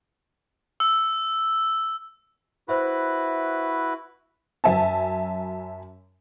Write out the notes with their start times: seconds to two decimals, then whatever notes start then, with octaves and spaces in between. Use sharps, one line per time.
0.80 E6
2.68 E4 F#4 B4 C5 E5 B5
4.64 F#2 E5 G#5 A5